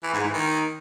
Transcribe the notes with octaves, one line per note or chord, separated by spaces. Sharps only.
E3
G#2
E3
D#3